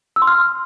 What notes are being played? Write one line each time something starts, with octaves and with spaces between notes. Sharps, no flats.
E6
C6
F6